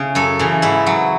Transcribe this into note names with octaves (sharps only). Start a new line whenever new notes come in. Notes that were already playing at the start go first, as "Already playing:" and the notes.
Already playing: C#3 E4
F#2 A4
C#3 E3
G#2 E4
F#3